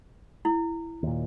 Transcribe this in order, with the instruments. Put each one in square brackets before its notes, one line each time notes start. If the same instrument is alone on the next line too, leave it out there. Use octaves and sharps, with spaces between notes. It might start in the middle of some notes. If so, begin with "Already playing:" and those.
[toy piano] E4
[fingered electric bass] D#2 A#2